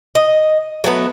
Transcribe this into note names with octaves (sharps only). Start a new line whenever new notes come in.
D#5
F#3 A3 B3 B4